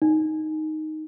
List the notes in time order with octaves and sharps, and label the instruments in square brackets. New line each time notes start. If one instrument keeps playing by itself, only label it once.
[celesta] D#4